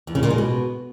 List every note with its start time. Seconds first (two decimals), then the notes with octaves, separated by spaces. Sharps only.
0.07 E2
0.15 C#3
0.23 A#2
0.30 G#3
0.38 B2